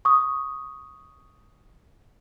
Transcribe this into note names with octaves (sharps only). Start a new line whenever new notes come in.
C#6 D#6